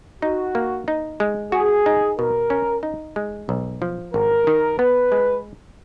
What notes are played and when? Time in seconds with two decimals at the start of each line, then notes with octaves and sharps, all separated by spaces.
0.22 D#4 F#4
0.55 A#3
0.88 D#4
1.20 G#3
1.52 F#4 G#4
1.86 D#4
2.18 B2 A#4
2.50 C#4
2.83 D#4
3.16 G#3
3.49 B1
3.82 F3
4.14 G#1 A#4
4.47 D#3
4.79 B3 B4
5.12 G#3